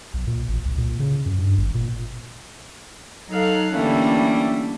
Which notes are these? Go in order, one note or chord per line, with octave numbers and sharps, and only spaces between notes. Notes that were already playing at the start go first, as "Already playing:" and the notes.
B1
A#2
A1
C2
A#2
C#3
F#2
G2
G#1
A#2
F#3 D#4 A4 F5 F#6
D3 E3 G3 A3 A#3 C#4